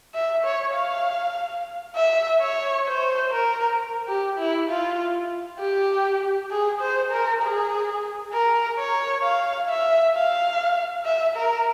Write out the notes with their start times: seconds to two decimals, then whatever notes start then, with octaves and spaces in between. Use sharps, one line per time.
0.14 E5
0.44 C#5
0.74 F5
1.96 E5
2.41 C#5
2.87 C5
3.32 A#4
4.08 G4
4.38 E4
4.68 F4
5.59 G4
6.50 G#4
6.80 C5
7.10 A#4
7.42 G#4
8.32 A#4
8.78 C#5
9.23 F5
9.69 E5
10.15 F5
11.04 E5
11.35 A#4